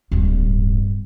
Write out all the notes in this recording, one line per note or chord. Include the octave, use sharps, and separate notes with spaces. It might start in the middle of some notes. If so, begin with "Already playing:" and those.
D1 G2